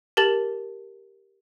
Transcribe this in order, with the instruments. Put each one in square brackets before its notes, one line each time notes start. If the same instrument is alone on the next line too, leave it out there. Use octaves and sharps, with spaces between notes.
[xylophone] G4 A#4 A5 A6 F#7